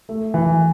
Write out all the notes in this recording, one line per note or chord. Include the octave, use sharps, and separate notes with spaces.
A3
E3